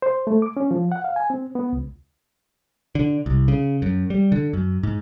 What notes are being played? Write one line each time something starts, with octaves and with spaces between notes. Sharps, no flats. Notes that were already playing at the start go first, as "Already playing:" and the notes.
C5
A3
D6
C#4
F3
F#5
F5
G#5
C4
B3
C#2
D3
C2
C#3
F#2
G3
D3
F#2
G#2